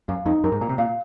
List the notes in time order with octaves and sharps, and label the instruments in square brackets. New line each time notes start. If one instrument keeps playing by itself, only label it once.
[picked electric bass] F#2 [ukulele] F5
[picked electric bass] F2 [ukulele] D#4
[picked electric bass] F#2 [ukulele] A#4
[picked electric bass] G#2
[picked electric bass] A#2 [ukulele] A#5
[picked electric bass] C3
[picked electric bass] A#2 [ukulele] F5